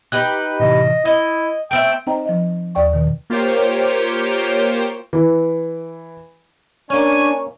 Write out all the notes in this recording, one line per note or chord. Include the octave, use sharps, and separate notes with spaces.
D#4 G4 B4 F#6 G6
A2 C3 E3 D#5
E4 D#5 D#6
A3 C4 E5 G5
C4 D#4 C5 D#5 G5 A#5
F3 D#5
D#2 D5 G5 C#6
B2 D#3
A#3 F4 G4 C5 C#5 G5
E3
A#3 C#4 D4 G#5 C#6